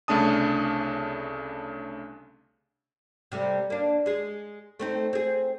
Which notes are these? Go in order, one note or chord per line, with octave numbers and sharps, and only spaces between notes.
C2 C#3 A3 D4 A5 D#6
C3 G3 A3
A#3 D4
G#3 G#4
A3 C4 D#4
C4 G#4